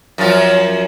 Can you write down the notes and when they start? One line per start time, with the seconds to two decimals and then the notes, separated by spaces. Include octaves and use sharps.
0.18 F#2 F3 F4